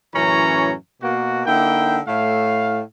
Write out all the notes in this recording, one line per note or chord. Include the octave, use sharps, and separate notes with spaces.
F#2 A2 E3 C#4 C#5 A#5
B2 A#3 F#4
D3 A#3 D#4 E4 G5
A2 A3 F5